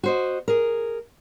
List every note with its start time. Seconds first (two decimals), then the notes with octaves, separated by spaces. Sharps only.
0.03 F#4 C5 D#5
0.48 G#4 A#4